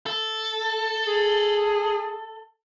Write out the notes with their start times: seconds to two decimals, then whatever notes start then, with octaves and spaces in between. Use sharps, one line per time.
0.06 A4
1.07 G#4